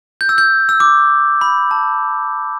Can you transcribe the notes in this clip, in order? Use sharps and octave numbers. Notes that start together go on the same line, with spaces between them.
G6
E6
G6
E6
D6
B5
A5